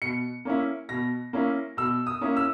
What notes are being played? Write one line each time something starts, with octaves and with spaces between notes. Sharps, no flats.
B2 C#7
A#3 C#4 E4
B2 A#6
A#3 C#4 E4
B2 E6
D#6
A#3 C#4 E4
E6